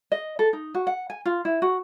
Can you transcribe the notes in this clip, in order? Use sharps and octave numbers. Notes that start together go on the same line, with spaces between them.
D#5
A4
D#4
F#4
F#5
G#5
F4
E4
F#4